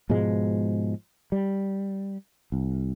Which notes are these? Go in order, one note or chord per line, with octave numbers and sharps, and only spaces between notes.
G#2 B2 F3 G#3
G3
C2